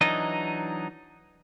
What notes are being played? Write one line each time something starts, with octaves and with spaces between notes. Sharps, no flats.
E3 F#3 D4 D#4 D#5